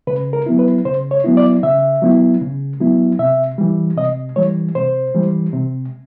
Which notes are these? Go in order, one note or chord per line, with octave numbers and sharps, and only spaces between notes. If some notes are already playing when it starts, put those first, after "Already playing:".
C#3 B4
A#4
F#3 B3 E4
B4
C#3 C5
C#5
F#3 B3 E4
D5
C#3 E5
F#3 B3 E4
C#3
F#3 B3 E4
C3 E5
E3 G3
C3 D#5
E3 G3 C#5
C3 C5
E3 G3
C3